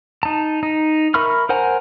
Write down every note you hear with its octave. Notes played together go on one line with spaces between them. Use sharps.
D#4 A5
D#4
A#4 E5 B5 C#6 F6
A#4 C5 F#5 G#5 A#5